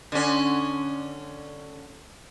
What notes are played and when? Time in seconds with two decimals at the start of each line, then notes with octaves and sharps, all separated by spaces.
0.12 D3 C#4